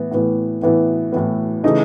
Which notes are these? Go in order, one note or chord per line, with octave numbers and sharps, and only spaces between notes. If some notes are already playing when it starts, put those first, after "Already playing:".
Already playing: A2 E3 B3
A2 E3 B3
A2 E3 B3
A2 E3 B3
C#3 E3 A3 D#4